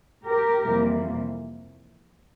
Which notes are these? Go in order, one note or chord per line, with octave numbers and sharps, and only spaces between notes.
G4 A#4
F2 C3 E3 G3 A#3